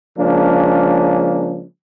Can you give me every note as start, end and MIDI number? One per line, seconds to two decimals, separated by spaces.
0.17 1.65 49
0.17 1.65 53
0.17 1.65 56
0.17 1.65 58
0.17 1.65 61
0.17 1.65 62